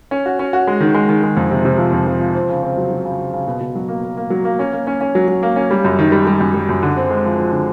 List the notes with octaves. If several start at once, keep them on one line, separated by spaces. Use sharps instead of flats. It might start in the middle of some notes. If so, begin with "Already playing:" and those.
C#4
F#4
C#4
F#4
G#3
D#3
G#3
D#3
G#3
F2
C3
C3
F3
F2
F3
F3
C4
C#3
C4
F#3
F#3
C#3
C#3
C#3
B2
B2
F#3
A#3
A#3
A#3
F#3
A#3
C#4
A#3
C#4
C#4
F#3
F#3
A#3
C#4
G3
F#2
D#3
G3
G3
F#2
G3
F#2
D3
C4
G#3
F3
F3
D3